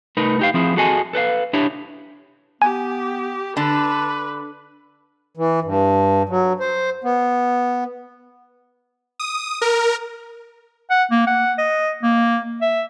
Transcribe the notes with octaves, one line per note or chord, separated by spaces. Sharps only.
C2 A3 D#4 A#4 B4
D#4 G4 F5
F3 C4 E4 G#4
F#4 G#4 A4 D#5 G#5
A4 B4 D5 F5
D4 E4 G4 C#5
B3 G4 G#5
D3 B4 A5
E3
G2
F#3
C5
B3
D#6
A#4
F#5
A#3
F#5
D#5
A#3
E5